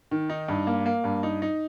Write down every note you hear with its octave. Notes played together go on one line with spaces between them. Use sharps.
D#3
D#4
G2
A#3
A#3
G2
D#4
D#4